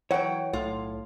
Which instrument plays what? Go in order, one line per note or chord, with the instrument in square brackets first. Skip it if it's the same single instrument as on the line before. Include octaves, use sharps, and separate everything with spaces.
[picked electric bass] E3 [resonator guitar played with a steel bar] F#3 G5 [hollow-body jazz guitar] C#5 F#5
[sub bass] B1 [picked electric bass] A2 [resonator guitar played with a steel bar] F4